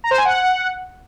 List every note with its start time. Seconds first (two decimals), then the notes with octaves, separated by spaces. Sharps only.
0.04 A#5
0.11 C5
0.18 G#5
0.25 F#5